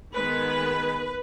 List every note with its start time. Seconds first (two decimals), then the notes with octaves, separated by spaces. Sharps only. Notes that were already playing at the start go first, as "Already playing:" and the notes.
0.14 D#3 G#3 B3 B4